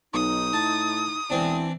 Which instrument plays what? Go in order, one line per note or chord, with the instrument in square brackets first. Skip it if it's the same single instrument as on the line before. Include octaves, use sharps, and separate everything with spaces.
[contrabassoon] B1 [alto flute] D#4 [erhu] D#6
[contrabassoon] A2 [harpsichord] A5
[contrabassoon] E1 [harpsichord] E3 C4 D4 [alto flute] E4